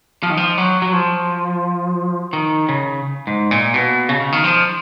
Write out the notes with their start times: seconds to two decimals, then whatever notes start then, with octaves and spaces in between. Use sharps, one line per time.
0.23 F3
0.30 D#3
0.37 F3
0.58 F#3
0.82 F#3
0.93 F3
2.33 D#3
2.69 C#3
3.27 G#2
3.51 A#2
3.74 B2
4.09 C#3
4.20 C#3
4.32 D#3
4.44 F3